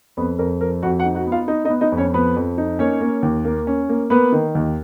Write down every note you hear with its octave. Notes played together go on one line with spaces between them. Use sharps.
F2 B3 B4
F2 A#4
F3 A#4
F2 F#4 F#5
F#4 F#5
D#4
F#4 F#5
B3
F4 F5
D#4 D#5
D#4 D#5
B3
D#4 D#5
F2
C#4 C#5
F3 B3 B4
F2
D#4
A#3 C#4 C#5
A#3
D#2
A#3
C#4
A#3
A#3 B3 B4
D#3
D#2